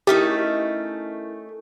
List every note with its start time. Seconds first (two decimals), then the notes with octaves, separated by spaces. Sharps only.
0.07 A3 C#4 D#4 E4 G4 A#4 A6